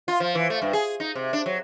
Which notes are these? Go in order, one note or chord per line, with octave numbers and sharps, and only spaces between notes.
F4
F3
E3
A3
G2
G#4
D#4
C3
D4
F#3